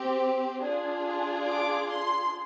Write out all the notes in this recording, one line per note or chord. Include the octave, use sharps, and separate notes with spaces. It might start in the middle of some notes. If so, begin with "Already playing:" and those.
Already playing: C4 G4
D4 F4 G#4
D6
C6